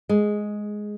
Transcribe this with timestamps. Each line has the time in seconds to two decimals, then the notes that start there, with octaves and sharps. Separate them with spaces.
0.09 G#3